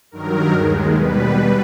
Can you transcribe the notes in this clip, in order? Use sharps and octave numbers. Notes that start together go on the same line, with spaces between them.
G2 D#3 F#3 A#4
D#2 D#3 G#3
B2 G3 B4